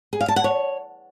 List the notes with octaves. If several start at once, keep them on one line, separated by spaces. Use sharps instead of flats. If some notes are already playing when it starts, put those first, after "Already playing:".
G#4
F5
A5
F#5
C#5